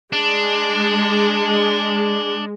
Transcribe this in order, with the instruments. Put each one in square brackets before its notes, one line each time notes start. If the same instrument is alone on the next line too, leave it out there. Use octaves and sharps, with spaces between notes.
[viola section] G#3 [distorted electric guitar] D4